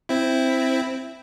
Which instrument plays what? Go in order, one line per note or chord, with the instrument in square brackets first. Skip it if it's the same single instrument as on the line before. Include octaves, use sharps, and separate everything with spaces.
[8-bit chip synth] C4 E4